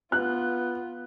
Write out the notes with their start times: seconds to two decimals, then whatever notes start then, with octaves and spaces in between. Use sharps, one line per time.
0.12 B3 F4 F#6